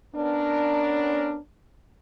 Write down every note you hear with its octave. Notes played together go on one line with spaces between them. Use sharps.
B3 C#4 D4 A#4